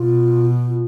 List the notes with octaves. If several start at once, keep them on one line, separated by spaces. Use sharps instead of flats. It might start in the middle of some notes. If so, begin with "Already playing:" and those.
Already playing: B2 F4
F4